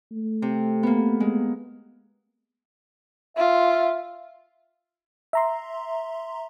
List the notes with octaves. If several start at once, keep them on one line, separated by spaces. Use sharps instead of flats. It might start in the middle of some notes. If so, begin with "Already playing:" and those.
A3
C3
A#3 B3
G#3
F4 E5
E5 A#5 C6